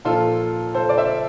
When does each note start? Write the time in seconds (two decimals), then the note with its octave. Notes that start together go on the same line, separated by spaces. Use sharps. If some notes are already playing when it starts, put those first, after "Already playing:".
0.05 A#2 F3 F4 A4
0.74 A4 C5
0.89 D5
0.97 C5 E5